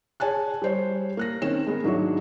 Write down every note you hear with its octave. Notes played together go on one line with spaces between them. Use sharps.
G#4 C#5 G#5 A5 F#6
G3 C5 C#5
A#3 F#6 A#6
D#3 C4 C#4 E7
G#3 B3 A#4
G#2 D#3 F#3 D4 E4 F#4